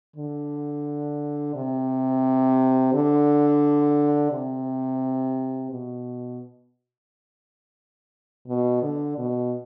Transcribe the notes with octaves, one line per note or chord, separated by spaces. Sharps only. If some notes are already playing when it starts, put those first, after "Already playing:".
D3
C3
D3
C3
B2
B2
D3
B2